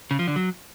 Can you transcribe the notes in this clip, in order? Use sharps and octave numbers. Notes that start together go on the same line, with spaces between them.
C#3
F3
D3
F#3